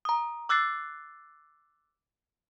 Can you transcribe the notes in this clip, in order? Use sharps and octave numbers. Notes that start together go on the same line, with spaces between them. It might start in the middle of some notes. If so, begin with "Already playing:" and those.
A#5 D#6
D6 E6 F#6 A6 C7